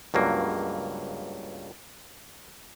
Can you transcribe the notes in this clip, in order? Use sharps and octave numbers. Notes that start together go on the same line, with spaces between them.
C#2 G2 F#3 A#3